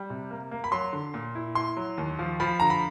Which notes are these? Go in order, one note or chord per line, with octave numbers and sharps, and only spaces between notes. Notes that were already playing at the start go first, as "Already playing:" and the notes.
Already playing: G3
C3
A#3
A#3
B5
F#3 C6
D3
A#2
E4
E4 C6
F#3
D#2
F3
F3 B5
D3 A#5
B5